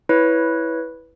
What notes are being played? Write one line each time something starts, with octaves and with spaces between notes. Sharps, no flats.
E4 B4 C#5